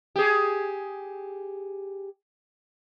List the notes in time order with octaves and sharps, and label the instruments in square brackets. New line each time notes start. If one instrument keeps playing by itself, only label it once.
[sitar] G4 G#4